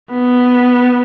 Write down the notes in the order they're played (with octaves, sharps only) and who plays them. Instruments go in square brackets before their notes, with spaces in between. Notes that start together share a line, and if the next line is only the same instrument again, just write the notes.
[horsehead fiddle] B3